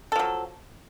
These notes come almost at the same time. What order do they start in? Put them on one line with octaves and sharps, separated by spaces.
A4 F3 F#3